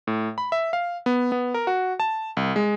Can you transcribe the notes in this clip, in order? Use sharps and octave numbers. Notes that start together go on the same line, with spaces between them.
A2
B5
E5
F5
B3
B3
A#4
F#4
A5
C2
G#3